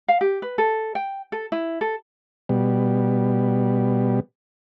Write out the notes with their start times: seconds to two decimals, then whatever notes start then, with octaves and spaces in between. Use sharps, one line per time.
0.08 F5
0.21 G4
0.42 B4
0.58 A4
0.95 G5
1.32 A4
1.52 E4
1.81 A4
2.49 B2 G3